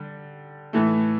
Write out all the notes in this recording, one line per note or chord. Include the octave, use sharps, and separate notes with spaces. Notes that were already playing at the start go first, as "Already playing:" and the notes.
Already playing: D3 G3
A2 E3 A3